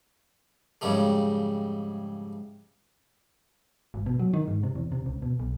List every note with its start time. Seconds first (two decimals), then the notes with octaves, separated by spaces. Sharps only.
0.81 F2 G#2 C#3 G3 A3
3.94 G#1
4.06 B2
4.20 F#3
4.34 D#3
4.48 G#2
4.63 C3
4.75 E2
4.92 C3
5.06 C#2
5.22 B2
5.40 B1